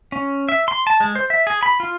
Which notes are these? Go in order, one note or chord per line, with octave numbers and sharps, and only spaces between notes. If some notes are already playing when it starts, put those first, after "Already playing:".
C#4
E5
C6
A5
G#3
C5
E5
G#4
B5
F4